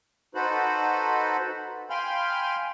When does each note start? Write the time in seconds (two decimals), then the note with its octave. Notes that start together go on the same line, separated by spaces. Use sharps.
0.35 D#4 F#4 A4 B4 C5 B5
1.90 F5 G5 G#5 B5 C6 F6